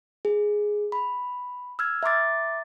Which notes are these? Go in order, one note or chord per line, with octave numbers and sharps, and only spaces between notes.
G#4
B5
E6 F6 G#6
E5 A#5 C6 D6 A6